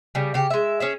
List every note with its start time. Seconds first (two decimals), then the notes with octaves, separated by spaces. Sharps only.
0.15 C#3 G3
0.34 C#3 G4
0.50 G#3 E5
0.80 C#4 G#4 E5